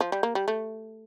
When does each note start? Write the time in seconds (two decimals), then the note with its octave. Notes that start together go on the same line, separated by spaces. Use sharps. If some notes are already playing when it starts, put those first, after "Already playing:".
0.01 F3
0.12 G3
0.23 A#3
0.35 G3
0.48 A3